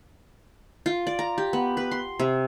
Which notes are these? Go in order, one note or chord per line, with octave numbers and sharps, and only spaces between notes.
F4
D5
A#5
G4
B3
B4
C6
C3